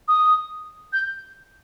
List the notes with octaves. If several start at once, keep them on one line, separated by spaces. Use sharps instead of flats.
D#6
G6